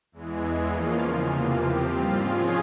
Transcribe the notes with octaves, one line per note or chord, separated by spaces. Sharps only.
E2 E3 G#3
E2 E3 G#3
F3 A#3 C#4 F4
E2 C#3 F3
C3 E3 A#3 F4
F3 C4 G4
G#2 G3 C4 F4
F3 G#3 C#4 F4 G#4